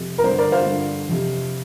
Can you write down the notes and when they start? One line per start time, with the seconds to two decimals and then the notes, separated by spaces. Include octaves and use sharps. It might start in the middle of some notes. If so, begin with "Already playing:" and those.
Already playing: F2 C3
0.18 A#4
0.24 G2 D3 C5
0.38 A#4 D5
0.52 C5 F5
0.67 G2 D3
1.09 F2 C3